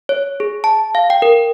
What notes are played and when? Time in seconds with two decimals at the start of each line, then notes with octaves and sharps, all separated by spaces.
0.09 C#5
0.40 G#4
0.64 A5
0.95 F5
1.10 G5
1.22 A#4